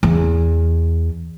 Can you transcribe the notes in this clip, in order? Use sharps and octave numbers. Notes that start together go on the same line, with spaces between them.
E2